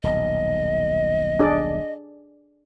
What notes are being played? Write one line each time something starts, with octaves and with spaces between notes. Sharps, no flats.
D#1 B1 D#5
D4 G#4 D5